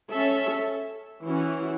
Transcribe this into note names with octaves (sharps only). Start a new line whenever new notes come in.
C#4 A4 E5
E3 C#4 F#4